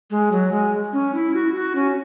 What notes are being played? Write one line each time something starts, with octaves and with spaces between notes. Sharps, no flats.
G#3
F#3
G#3
C#4
E4
F#4
F#4
C#4